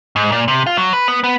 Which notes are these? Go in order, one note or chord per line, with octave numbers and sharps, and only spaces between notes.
G#2
A#2
C3
F4
F#3
B4
B3
B3